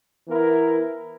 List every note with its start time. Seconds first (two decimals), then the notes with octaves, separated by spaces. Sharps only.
0.28 E3 B3 E4 A#4